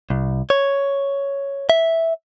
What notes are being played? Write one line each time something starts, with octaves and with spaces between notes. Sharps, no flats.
C2
C#5
E5